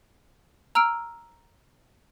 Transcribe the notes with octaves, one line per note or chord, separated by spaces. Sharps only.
A#5 E6 F6 D7